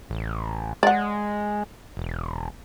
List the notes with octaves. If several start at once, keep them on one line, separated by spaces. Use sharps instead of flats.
A1
G#3 D5 F#5
E1